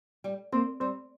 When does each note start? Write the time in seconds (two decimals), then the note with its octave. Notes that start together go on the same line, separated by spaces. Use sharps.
0.24 G3
0.52 A#3 C4
0.80 G3 C4